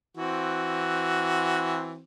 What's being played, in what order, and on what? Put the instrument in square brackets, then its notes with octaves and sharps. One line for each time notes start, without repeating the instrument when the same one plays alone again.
[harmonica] E3 C4 F#4